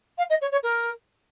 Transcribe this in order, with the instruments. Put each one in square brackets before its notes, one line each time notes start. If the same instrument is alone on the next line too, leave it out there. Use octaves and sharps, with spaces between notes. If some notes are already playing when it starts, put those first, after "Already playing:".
[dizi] F5
D#5
C#5
C#5
A#4